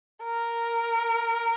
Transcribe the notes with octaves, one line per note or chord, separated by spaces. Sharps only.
A#4